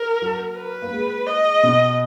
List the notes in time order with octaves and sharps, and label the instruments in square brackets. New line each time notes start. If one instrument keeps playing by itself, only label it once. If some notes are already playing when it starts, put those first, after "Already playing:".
Already playing: [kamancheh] A#4
[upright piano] F#3
[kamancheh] B4
[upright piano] A#3
G#3
[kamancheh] D#5
[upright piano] B2